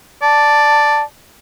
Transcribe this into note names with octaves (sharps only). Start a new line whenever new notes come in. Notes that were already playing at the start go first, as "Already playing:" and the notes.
D5 A5